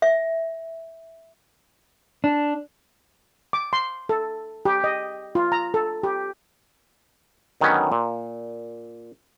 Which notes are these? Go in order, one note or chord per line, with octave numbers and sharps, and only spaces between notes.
E5
D4
D6
C6
A4
G4
D#5
F4
A#5
A4
G4
D3 D#3 F#3 B3 C#4
A#2